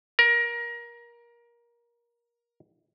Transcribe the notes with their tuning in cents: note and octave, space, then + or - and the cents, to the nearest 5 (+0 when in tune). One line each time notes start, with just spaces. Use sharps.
A#4 +20